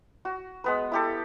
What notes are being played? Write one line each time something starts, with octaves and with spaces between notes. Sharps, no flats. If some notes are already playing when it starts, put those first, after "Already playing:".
F#4
G#3 B3 B4
E4 G4 A4